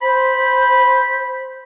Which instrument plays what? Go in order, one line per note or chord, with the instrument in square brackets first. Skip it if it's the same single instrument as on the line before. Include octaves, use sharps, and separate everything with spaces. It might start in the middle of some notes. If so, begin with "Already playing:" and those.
[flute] C5 [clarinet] B5